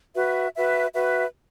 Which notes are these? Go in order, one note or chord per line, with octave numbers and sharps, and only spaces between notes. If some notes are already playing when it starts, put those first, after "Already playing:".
F#4 B4 E5
F#4 B4 E5
F#4 B4 E5